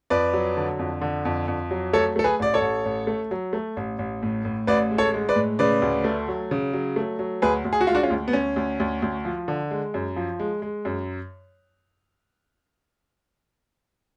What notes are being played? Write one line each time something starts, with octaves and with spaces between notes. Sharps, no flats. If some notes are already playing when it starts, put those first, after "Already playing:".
F2 B4 D5
F#3
D3
F2
D3
F2
F2
F#3
A3 A4 C#5
A3 A4
G#4 B4
A1 D5
A4 C#5
A1
A1
A3
F#3
A3
A1
A1
A2
A2
A1 B4 D5
G#3
A4 C#5
G#3
B4 D5
A2
C#3 B4 D5
D2
A3
F#3
C#3
F#3
A3
F#3
D2 G#4 B4
D2
G#4
F#4
G#3 F4
D4 F#4
C#4 F4
D2
B3
D2 C#4
D2
D2
D2
F3
D3
G#3
F#2
F3
G#3
G#3
F#2